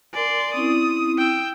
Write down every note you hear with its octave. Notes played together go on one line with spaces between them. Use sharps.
A#4 D5 G#5 C6
C4 C#4 E4 D#6
G5 E6